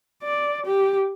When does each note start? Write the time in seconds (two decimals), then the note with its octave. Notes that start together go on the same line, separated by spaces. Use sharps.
0.23 D5
0.66 G4